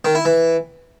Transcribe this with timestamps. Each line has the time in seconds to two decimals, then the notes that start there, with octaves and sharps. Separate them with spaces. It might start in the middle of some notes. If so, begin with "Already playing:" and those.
0.05 D#3
0.15 E4
0.25 E3